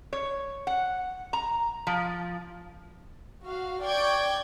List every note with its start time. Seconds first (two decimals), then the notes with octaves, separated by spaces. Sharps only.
0.13 C#5
0.67 F#5
1.33 A#5
1.87 F3
3.44 F#4 F5
3.83 D5 G5 C#6 G6 G#6 D7